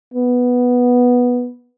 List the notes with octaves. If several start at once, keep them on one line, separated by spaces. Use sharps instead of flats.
B3